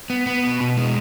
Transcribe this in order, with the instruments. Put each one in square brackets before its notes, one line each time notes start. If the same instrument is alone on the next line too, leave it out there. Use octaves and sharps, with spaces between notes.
[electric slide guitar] B3
B3
B2
B2
G#3